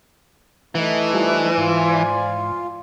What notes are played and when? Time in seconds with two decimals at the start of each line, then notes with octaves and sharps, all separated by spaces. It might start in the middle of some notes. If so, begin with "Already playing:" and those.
0.75 E3 A3 D#4
1.13 G3 E4 F4 C5 D5 G#5
1.57 G#2 F4